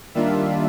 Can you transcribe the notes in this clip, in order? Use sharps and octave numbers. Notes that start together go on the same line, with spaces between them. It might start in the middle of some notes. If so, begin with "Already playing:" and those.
D#3 G3 A#3 D4 F4 E5